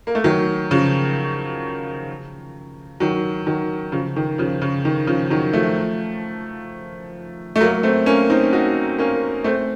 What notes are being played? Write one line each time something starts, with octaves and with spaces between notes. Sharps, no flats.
A#3
A3
D#3 F#3
C#3 F3
D#3 F#3
D#3 F#3
C#3 F3
D#3
C#3 F3
C#3
D#3
C#3 F3
D#3 F#3
F3 A3
A3
F#3 A#3
A3 C4
A#3 C#4
C4 D#4
D#4 F#4
A#3 C#4
A3 C4